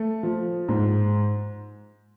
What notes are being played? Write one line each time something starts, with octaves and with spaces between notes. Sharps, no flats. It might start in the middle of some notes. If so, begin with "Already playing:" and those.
Already playing: A3
F3
G#2